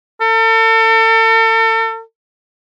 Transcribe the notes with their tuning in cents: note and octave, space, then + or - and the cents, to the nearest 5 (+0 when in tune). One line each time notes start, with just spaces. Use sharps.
A4 +40